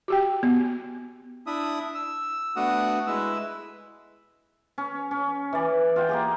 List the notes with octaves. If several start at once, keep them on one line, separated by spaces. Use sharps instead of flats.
F#4 G4 G5
B3
D4 E4 E5 D#6
E6
A3 B3 D4 F#4 F#5 D#6
G#3 E4 B4 E6
C#4
C#4
E3 D5
F4 F#5 G5
A#3 G4 G#4